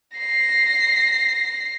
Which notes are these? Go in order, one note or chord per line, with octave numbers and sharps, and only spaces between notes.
A#6 C7